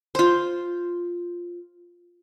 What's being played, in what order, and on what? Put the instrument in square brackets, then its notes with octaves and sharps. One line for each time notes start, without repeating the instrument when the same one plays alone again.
[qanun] F4 C5